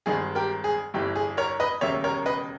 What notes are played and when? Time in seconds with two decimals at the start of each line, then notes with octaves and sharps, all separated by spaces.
0.06 G#1 G2 D#3 G#3 G#4
0.35 G4 A#4
0.64 G#4
0.94 G1 G2 E3 G4
1.16 G#4
1.37 A#4 C#5
1.60 B4 D#5
1.81 E1 D#2 C#3 G3 A#3 C#5 E5
2.04 A#4 C#5
2.26 B4 D#5